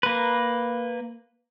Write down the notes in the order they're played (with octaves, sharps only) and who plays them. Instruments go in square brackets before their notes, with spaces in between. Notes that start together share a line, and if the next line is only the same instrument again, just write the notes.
[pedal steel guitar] A#3 B4